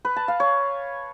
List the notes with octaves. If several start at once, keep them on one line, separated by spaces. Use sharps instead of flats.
B4
A5
F5
C#5